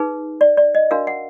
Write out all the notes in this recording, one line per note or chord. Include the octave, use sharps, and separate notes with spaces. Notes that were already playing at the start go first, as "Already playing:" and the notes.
Already playing: D#4 G#4 B4
D5
D5
D#5
D4 F#4 A#4 F5
F#5